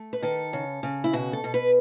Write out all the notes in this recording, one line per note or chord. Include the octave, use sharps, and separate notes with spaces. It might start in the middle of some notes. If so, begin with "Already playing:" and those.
Already playing: A3
B4
D#3 A4
C#3
C#3
E4
B2 F#4
A4
B2
B4